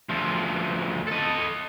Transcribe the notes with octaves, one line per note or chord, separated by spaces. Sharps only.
D2 F3
A4 D#5